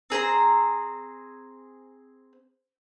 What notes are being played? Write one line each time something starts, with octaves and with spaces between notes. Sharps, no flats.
C4 G#4 C5 A#5